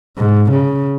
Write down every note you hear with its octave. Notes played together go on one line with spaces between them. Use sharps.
G#2
C#3